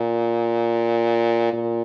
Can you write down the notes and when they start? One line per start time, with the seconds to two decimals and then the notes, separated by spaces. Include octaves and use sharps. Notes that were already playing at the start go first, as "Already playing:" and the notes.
Already playing: A#2
1.53 A#2